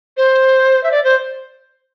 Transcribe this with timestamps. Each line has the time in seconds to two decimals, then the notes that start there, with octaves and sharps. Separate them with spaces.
0.17 C5
0.84 E5
0.91 D5
1.04 C5